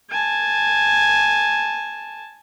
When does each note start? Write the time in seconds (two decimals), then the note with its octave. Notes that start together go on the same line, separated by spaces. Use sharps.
0.10 G#5 A5